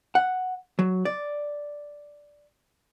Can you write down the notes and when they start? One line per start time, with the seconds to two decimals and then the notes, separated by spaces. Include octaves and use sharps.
0.15 F#5
0.79 F#3
1.05 D5